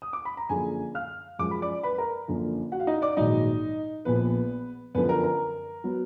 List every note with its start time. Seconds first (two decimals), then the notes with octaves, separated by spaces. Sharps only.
0.02 D#6
0.13 D6
0.25 B5
0.37 A#5
0.49 F#2 D3 F3 A#3 G#4 G#5
0.95 F5 F6
1.39 F#2 F3 G#3 D6
1.51 B5
1.62 D5 D6
1.83 B4 B5
1.98 A#4 A#5
2.28 F#2 D3 F3 A#3
2.72 F#4 F#5
2.80 F5
2.87 D#4 D#5
3.02 D5 D6
3.17 A#1 G#2 D#3 F#3 D#4 D#5
4.05 A#1 A#2 F3 A#3 B3 B4
4.95 F#2 D3 F3 B3 B4
5.09 A#4
5.24 A#4
5.84 F#3 B3